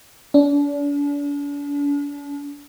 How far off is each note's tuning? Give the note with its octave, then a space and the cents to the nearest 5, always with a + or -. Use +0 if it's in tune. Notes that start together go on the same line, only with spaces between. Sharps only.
D4 -40